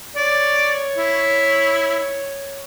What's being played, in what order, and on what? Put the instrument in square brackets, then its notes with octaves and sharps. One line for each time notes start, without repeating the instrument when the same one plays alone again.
[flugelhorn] C#5 [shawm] D5
[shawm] E4